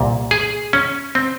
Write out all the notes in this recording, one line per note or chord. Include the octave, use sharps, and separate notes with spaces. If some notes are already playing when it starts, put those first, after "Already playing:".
Already playing: C2 A#2
G#4
C#4
C4